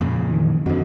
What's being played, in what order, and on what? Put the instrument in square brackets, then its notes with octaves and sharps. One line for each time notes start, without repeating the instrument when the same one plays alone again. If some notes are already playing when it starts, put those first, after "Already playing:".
[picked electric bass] F2 A#2 C#3
[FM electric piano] D#3 E3
[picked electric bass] F2 D3 [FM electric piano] C4 F#4 D#5